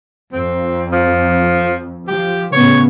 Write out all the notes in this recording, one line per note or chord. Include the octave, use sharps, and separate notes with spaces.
F2 C4
F3
F3 G4
A2 C#3 B3 C#5